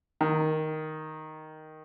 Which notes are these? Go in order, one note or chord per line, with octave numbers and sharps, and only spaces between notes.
D#3